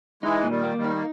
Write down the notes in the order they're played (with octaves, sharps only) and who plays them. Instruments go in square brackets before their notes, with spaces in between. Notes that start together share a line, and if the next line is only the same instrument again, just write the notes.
[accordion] E3 G#3 [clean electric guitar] D#4
[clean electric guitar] A#2
[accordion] D#3 G3
[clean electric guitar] A#3
[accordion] D#3 G3
[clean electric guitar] D#4
[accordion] A#3